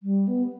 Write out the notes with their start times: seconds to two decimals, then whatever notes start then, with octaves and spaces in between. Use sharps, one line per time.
0.03 G3
0.28 B3